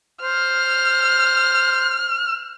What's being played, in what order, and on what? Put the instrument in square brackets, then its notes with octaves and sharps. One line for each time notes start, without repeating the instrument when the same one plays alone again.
[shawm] C5 [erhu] F6